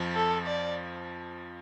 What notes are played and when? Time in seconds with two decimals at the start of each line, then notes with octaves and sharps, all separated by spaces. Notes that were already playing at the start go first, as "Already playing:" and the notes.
Already playing: F2 F3
0.15 A4
0.47 D5